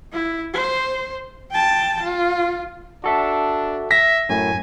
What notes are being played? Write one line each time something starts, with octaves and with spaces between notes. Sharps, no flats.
E4
C5
G5 A5
F4
D4 F#4 A4 E5
E5 A#6 B6
F#2 A2 G#5